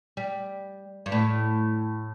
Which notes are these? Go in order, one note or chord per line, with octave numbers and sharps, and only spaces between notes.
G3
G2
A2